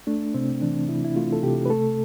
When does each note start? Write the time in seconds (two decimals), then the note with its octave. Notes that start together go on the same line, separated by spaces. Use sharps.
0.07 A3 D4
0.34 C3 C4
0.62 E3 D4
0.89 C3 E4
1.05 E4
1.16 A3 F4
1.32 A4
1.43 C3 G4
1.65 B4
1.70 A3 A4